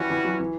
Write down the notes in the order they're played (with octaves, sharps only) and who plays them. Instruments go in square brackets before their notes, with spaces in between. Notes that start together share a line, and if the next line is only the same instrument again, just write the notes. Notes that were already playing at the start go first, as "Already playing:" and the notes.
Already playing: [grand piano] E3 [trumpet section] G3 C#4 F#4
[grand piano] E3
F#3
E3